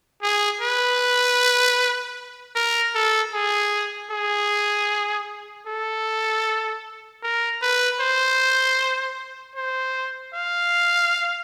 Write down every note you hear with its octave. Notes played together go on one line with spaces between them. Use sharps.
G#4
B4
A#4
A4
G#4
G#4
A4
A#4
B4
C5
C5
F5